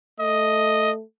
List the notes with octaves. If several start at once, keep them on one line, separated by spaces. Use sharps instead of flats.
A3 D#5